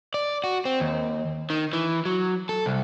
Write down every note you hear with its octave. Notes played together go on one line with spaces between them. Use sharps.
D5
F#4
C4
D#2
D#3
E3
F#3
A4
C2